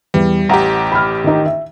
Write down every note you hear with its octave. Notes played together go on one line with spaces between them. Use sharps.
E2 G3
A1 G4 F#5 A#5
B5 F6
D#3 D#4
E5